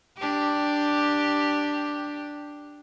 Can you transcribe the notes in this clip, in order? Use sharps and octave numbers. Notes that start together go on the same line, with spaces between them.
D4 G4